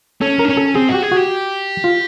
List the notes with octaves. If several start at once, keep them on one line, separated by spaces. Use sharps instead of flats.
C#4 A4
A#4
D4
C#4
A4
C4 G#4
F#4
G4
G#4
F#4
G4
F4